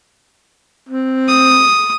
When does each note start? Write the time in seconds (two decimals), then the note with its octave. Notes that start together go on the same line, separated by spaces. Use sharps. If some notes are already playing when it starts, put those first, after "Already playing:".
0.89 C4
1.28 D#6